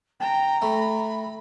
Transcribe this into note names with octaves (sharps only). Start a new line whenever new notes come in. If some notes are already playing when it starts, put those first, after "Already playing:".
G5 A#5
A3 B5